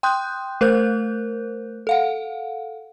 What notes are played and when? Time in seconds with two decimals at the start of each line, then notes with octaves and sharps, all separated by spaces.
0.03 G5 C6 D#6 F#6 G6
0.61 A3 A#4 C5 F#6 G6
1.87 A4 F5 F#5